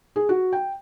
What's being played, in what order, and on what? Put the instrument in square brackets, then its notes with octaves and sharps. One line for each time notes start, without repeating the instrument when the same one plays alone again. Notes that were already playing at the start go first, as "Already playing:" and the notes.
[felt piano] G#4
F#4
G5